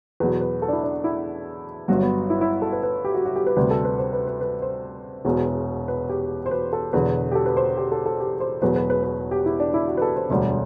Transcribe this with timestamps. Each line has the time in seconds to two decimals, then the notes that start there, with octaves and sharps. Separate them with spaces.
0.20 E2 B2 F#3 B4
0.41 B4
0.62 A4
0.68 D4
0.73 E4
0.84 D4
1.04 E4
1.88 G1 G2 F#3 F#4
2.02 B3
2.30 E4
2.41 E4
2.62 A4
2.73 B4
2.83 B4
3.05 G4
3.14 F#4
3.25 F#4
3.36 G4
3.47 B4
3.57 D2 C3 G3 B4
3.71 A4
3.85 B4
3.99 C5
4.13 B4
4.27 B4
4.41 B4
4.62 C5
5.25 E1 E2 B2
5.88 B4
6.09 G4
6.46 C5
6.51 B4
6.73 A4
6.93 E1 E2 D3 B4
7.32 G4
7.35 A4
7.46 B4
7.57 C5
7.77 G4
7.92 A4
8.06 A4
8.20 G4
8.40 C5
8.62 E1 E2 B2 F#3 B4
8.76 B4
8.90 B4
9.04 B4
9.31 G4
9.46 E4
9.60 D4
9.74 E4
9.88 F#4
9.97 B4
10.02 A4
10.16 C5
10.30 E1 D2 D3 G3